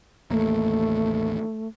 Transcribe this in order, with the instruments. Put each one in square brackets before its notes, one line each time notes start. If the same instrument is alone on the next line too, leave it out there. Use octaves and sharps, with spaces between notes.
[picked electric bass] A1 D#2 A#3 [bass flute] A3